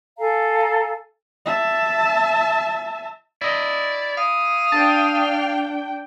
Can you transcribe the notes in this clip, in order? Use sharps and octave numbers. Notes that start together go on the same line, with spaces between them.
A4 F5 G#5 A#5
E5 A5
E4 D5 D#5
F5 D#6
D4 G5 A5